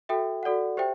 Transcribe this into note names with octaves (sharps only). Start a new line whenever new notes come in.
F#4 A4 E5 G5
F#4 A4 D5 F#5
G4 C5 E5 G5